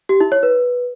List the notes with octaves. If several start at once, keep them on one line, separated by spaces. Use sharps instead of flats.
G4
E4
C#5
B4